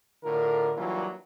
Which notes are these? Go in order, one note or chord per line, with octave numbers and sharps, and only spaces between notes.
A2 D3 F4 A#4
E3 F#3 G3 A#3 D4 F4